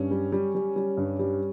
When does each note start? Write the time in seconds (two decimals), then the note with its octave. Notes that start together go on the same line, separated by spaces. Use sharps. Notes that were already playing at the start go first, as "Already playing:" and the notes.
Already playing: G2 C#4
0.11 G3
0.32 G3
0.55 G3
0.76 G3
0.97 G2
1.19 G3